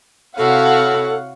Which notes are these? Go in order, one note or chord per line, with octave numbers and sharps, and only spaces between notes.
C3 E4 F#4 A4 C#5 F5 F#5